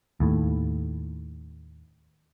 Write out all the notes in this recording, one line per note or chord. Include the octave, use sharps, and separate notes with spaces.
D#2 A2